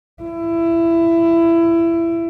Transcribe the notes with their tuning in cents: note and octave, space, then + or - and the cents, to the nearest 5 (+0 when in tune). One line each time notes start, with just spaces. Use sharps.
E4 +20